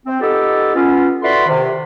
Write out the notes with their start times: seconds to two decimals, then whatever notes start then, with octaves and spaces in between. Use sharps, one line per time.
0.06 C4
0.21 B3 D#4 F4 G4 A4
0.75 B3 C#4 F4
1.23 E4 F#4 A4 B4 D5 C6
1.47 C3 D#3